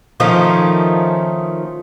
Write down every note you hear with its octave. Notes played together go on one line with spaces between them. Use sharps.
D#3 F3 A3 C#4